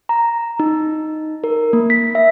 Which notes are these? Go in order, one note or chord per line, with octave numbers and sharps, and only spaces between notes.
A#5
D#4
A#4
A#3
B6
E5